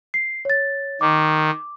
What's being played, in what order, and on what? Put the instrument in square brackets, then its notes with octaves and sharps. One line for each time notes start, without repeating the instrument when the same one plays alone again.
[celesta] C7
C#5 A6
[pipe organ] D#3 [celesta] D6